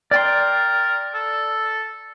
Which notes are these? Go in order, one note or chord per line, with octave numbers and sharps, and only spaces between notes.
A#4 D5 G5 C6
A4